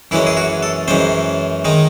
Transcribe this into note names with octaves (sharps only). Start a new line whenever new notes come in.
F#2 E3 G#3 C#4 E4
G#4
F#4
A4
F#2 E3 G#3 C#4 C5
D#3 G#3 D#4